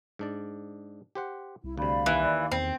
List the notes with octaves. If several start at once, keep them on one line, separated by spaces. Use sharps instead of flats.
G#2 D4 D5
G4 C5 F#5
C2 E4
D2 C3 D5 F5 B5
D#2 E3
E2 C4